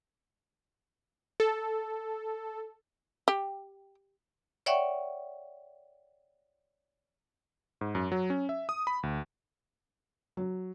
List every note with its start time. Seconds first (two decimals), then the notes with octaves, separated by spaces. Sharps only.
1.40 A4
3.28 G4
4.66 C#5 D5 E5 F#5 G5 C#6
7.81 G#2
7.95 F#2
8.12 F#3
8.30 C#4
8.49 E5
8.69 D#6
8.87 B5
9.03 D2
10.37 F#3